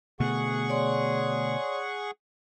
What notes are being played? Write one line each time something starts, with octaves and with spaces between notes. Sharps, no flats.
B2 D3 A3 G#4 F#5 C#6
C#5 D5 C6